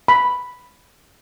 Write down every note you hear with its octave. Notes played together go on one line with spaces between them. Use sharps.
B5